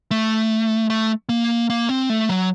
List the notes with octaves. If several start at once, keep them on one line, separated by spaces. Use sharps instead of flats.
A3
A3
A#3
A#3
C4
A3
F#3